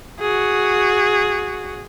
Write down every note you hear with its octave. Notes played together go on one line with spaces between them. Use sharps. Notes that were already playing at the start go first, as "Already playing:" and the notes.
F#4 G#4